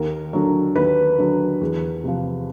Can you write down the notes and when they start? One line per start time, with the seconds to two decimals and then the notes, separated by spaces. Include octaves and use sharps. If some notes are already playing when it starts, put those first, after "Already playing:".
Already playing: D#2 A#4
0.33 D3 F#3
0.76 D#2 B4
1.19 D3 F#3
1.61 E2
2.04 C3 F3